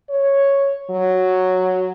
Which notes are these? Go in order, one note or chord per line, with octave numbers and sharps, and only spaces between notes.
C#5
F#3